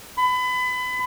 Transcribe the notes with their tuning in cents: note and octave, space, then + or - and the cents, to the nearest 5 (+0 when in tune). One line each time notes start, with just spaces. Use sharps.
B5 +25